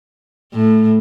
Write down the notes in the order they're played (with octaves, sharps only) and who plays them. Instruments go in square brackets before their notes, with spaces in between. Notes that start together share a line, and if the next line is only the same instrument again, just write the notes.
[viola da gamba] A2